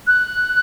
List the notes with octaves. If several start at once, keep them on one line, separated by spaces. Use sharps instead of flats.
F#6